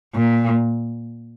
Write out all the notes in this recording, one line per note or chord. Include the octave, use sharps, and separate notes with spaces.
A#2